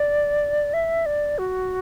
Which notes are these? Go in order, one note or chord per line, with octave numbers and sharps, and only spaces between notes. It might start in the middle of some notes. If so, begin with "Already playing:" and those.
Already playing: D5
E5
D5
F#4